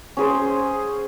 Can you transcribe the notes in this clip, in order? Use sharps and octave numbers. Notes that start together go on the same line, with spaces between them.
C#4 G#4 C5